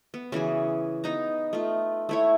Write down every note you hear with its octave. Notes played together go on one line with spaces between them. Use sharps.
B3
C#3 E3 F#4 G#4
B3 D#4 A#5
A3 F4
A3 E4 C#5